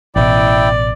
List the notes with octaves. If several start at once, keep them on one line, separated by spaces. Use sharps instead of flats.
A1 B2 E4 D5 G5